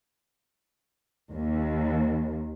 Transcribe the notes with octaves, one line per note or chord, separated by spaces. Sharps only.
D#2